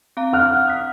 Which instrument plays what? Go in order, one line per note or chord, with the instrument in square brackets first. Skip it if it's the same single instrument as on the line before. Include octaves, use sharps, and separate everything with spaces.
[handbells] C4 F5 A#5
[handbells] F5 [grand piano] F#5 F6 F#6
[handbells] D#6 B6